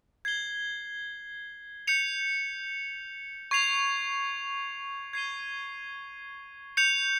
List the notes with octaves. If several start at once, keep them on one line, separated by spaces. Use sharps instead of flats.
G#6 C7 G7
G6 C#7 F7
C#6 G#6 C7 F7
G#6 C7 D#7 G7
G6 C#7 F7